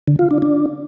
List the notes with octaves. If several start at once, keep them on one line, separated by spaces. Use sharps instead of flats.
D3
F4
D4
D4